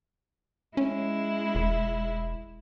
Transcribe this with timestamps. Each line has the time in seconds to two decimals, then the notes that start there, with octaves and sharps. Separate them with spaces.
0.77 G#3 C#4 E4
1.55 E1